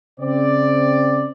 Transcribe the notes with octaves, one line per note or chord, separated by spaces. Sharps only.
C#3 C4 D5